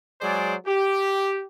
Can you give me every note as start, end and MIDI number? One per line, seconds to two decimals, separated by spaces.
0.21 0.54 54
0.21 0.54 56
0.21 0.54 68
0.21 0.54 72
0.21 0.54 74
0.66 1.44 67